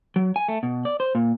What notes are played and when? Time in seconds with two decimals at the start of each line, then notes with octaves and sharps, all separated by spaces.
0.16 F#3
0.36 G#5
0.48 A3
0.63 B2
0.85 D5
1.00 C5
1.15 A#2